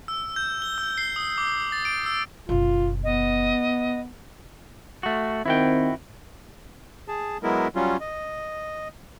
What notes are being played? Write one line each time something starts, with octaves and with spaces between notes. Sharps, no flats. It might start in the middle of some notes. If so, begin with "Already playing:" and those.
E6
G6
G7
E6
C7
D#6
D6
A6
D7
E6
F#1 B2 F4
B3 D#5
A3 F#4
D#3 C4 E4 F#4 G5
G#4 A5
F#3 G#3 B3 E4 A#4
F#3 G3 C#4 F4
D#5